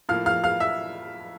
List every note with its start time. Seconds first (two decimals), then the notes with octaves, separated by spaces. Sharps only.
0.09 A2 F3 A#3 F5 F6
0.26 F5 F6
0.44 F5 F6
0.60 E5 E6